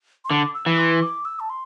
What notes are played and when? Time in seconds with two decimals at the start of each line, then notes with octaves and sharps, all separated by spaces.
0.25 C6
0.29 D3 D6
0.54 E6
0.66 E3
0.78 C6
1.02 D6
1.25 E6
1.40 A5
1.50 C6